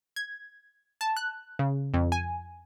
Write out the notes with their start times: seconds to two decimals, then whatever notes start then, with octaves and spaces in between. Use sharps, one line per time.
0.16 G#6
1.01 A5
1.17 F#6
1.59 C#3
1.94 F2
2.12 G#5